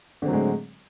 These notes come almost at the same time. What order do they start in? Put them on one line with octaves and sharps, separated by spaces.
D3 C4 F#3 A2 G#3